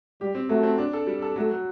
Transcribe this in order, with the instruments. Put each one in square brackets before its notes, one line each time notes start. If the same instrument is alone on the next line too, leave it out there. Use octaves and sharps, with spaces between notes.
[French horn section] G3 [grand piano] G4
[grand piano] C4
[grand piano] F#3 [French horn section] A3
[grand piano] C4
D4
A4
G3
A4
[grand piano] F#3 [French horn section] A3
[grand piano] F#3